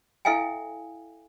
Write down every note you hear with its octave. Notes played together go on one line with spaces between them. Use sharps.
E4 A4 E5 F5 G5 G#5